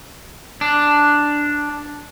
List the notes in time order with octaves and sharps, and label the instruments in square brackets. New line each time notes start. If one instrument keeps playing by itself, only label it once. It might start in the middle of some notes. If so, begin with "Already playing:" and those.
[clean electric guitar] D4